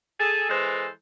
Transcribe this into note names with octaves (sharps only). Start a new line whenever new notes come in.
G#4 A4
E3 G#3 A4 C5